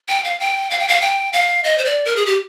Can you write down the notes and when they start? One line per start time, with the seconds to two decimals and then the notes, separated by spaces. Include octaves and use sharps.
0.09 G5
0.24 F5
0.40 G5
0.71 F5
0.80 G5
0.88 F5
1.01 G5
1.33 F5
1.64 D#5
1.78 C5
1.85 D5
2.05 A#4
2.16 G#4
2.26 G4